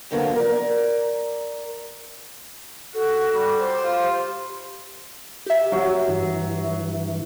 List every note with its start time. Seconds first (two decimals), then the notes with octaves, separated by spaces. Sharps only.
0.11 F#2 D3 F3 F#3 A#3 B3
0.36 A#4 D5
2.94 F#4 A4
3.35 G3
3.58 C5
3.84 F4 G4
5.46 G4 E5
5.72 F#3
6.08 G2 E3